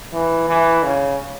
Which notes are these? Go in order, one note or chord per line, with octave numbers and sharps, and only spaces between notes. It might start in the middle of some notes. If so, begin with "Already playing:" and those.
E3
E3
C#3